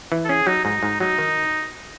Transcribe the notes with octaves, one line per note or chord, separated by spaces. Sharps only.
E3
A4
C#4 G#4
F#3 D#4
G#2 D#4
G#2
F#3 D#4
D#3